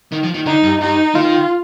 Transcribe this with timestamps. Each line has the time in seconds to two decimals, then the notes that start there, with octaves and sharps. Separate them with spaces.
0.12 D#3
0.23 F3
0.34 D#3
0.46 D3 D#4
0.63 G2
0.81 G2 D#4
1.15 D#3 F4